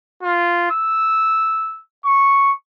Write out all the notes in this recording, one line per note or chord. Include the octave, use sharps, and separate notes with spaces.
F4
E6
C#6